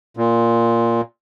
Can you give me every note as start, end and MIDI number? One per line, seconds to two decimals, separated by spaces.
0.17 1.01 46